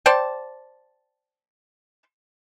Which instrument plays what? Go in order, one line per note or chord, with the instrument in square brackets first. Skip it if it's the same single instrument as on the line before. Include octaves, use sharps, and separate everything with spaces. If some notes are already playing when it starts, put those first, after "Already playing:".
[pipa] C5 D5 G5 A5